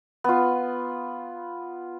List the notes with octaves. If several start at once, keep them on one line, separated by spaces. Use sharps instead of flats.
B3 F4